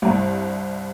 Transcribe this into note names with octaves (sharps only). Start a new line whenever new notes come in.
C2 G2